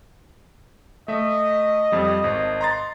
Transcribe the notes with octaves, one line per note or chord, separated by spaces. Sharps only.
A3 D#5 E5
F2 G3
G#1
A#5 C6 A6